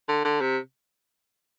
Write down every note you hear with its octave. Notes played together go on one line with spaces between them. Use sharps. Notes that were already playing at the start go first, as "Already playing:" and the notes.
D3
D3
C3